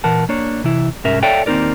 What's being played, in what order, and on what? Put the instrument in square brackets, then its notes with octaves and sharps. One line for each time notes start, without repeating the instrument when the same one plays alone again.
[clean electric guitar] A#2 E3 A#4 F#5 A5
A#3 D4 C#5
C3 E3 E4
C2 G#2 C#4 A#4 E5
A4 C#5 D5 E5 F5 G5
D#2 A#3 C4 D#4 A#4 D5